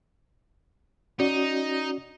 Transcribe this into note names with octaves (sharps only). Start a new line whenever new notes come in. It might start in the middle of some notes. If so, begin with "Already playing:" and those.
C#4 D#4 F#4 D5